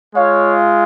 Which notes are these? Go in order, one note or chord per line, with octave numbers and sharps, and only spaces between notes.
G#3 F4 C#5 F5